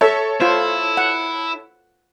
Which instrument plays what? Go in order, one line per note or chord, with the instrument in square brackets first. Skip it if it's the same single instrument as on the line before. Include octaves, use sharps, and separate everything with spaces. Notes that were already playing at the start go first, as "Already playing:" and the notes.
[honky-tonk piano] A4 C#5 [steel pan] E5
[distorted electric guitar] E4 [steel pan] F4 C5
[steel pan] F#5